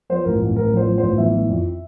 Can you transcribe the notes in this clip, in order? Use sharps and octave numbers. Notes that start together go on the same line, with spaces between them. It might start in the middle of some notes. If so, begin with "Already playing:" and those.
F3 C5
A1 A#4
A1
A1 A#4
F3
C5
F3
C5
A1
E3 E5
E3
F2